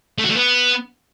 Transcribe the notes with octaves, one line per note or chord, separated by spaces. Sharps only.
A3
F#4
A3
B3